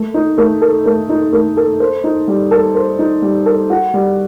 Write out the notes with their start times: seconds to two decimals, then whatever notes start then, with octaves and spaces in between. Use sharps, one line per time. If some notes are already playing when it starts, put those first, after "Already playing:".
Already playing: A3
0.14 D#4
0.38 A3
0.61 A4
0.86 A3
1.09 D#4
1.32 A3
1.57 A4
1.80 C5
2.04 D#4
2.28 G3
2.51 A4
2.75 C5
2.99 D#4
3.22 G3
3.46 A4
3.70 F#4
3.94 G3